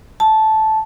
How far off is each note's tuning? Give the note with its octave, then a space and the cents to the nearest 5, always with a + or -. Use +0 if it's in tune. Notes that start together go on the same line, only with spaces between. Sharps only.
A5 -10